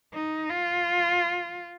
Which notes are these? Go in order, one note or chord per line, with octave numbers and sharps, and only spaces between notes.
D#4
F4